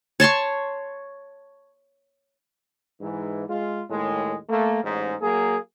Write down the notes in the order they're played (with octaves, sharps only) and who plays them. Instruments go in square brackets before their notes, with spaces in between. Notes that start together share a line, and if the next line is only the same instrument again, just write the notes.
[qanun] C#5 A5 C6 C#6
[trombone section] G#2 E3
G#3 F4
D#2 A2 G#3
A3 A#3
A1 G#2
F#3 A#3 G#4